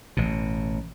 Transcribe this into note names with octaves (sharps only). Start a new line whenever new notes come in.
A1 B2